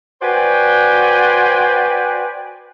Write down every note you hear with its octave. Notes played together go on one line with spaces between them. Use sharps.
F#4 B4 C5 D5 G5 G#5